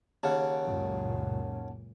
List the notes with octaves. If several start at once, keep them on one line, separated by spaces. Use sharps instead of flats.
D#2 C#3 F#5 A5
C#2 F#2 A#2